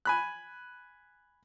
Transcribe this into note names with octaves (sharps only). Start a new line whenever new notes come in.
G#5 B5 F#6